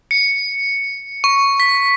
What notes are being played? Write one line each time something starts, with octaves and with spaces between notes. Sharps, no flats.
C#7
C#6
B6